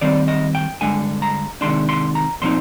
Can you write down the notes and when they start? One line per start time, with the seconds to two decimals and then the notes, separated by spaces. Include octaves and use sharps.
0.01 D#3 G3 C4 D#4 D5
0.28 D#5
0.55 G5
0.81 G2 D3 G#3 G#5
1.22 A#5
1.61 C3 D#3 G#3 D4 C6
1.89 C6
2.15 A#5
2.42 A#2 F3 C4 D#4 C6